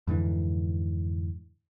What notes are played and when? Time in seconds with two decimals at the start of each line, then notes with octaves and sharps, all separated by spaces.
0.07 F2 G#2 D3 E3